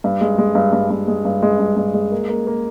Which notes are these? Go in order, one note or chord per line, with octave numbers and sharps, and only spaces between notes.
G2
G#3
G#3
G2
G2
G2
G#3
G2
G#3
G2
G2
G#3
A#3
A#3
A#3